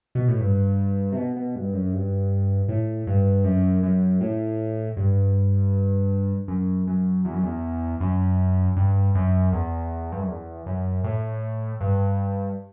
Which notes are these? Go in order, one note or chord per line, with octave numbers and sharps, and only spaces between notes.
B2
A2
G2
C3
B2
B2
G2
F#2
G2
A2
G2
F#2
F#2
A2
G2
F#2
F#2
E2
F#2
E2
F#2
G2
F#2
E2
G2
F#2
E2
F#2
A2
G2